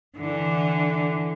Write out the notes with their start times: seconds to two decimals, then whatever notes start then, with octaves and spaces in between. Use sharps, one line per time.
0.16 D3 E3